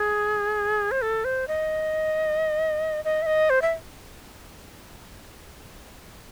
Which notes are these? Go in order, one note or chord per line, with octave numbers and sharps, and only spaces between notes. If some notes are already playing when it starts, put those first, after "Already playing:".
Already playing: G#4
C5
A4
C5
D#5
D#5
E5
D#5
C5
E5